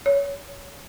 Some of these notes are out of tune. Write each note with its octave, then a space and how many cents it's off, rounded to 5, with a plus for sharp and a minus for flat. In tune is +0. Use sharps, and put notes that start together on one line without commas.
C#5 +20